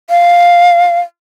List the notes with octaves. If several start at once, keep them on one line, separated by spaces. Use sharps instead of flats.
F5